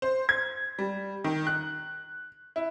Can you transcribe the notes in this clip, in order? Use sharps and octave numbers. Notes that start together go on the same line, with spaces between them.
C5
G#6
G3
D#3
F#6
E4